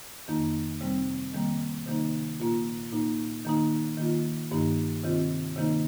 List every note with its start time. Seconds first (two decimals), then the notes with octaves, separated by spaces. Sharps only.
0.28 F2 D#3 A#3 D#4
0.81 C3 G3 C4
1.34 D#3 G3 A#3
1.86 C3 D#3 A#3 D#4
2.40 A#2 A#3 F4
2.92 A#2 A#3 D#4
3.45 D#3 A#3 D#4
3.97 D#3 A#3 F4
4.51 G2 D#3 A#3 D#4
5.04 C3 D#3 C4 F4
5.56 C3 D#3 A#3 D#4